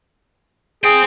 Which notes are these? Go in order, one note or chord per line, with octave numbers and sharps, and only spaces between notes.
G#4 C5 G5